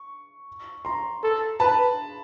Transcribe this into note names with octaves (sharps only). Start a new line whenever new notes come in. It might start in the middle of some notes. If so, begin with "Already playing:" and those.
Already playing: C#6
A#5 C6
A4
B4 A5 B5